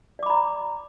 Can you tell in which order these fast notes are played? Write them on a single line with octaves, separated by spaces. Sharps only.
D5 D6 B5 A#5